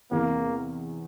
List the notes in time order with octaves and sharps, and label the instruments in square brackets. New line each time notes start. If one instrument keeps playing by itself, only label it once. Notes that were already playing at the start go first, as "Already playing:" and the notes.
[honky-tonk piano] E2 C3 E3 [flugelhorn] A#3